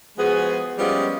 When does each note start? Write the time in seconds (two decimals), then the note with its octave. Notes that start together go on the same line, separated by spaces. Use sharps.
0.18 F3 G#3 B3 F#4 G#4
0.79 F3 G3 G#3 B3 C#4 F4